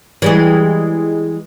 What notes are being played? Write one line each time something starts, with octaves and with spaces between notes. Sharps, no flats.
E3 G3 G#3